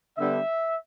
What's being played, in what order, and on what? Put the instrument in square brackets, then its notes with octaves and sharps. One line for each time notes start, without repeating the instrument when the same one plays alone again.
[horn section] D3 G3 B3 D4 E5